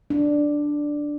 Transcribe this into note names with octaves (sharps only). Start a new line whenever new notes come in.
D4